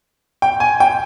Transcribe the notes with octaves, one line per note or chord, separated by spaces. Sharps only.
G5
G#5
G5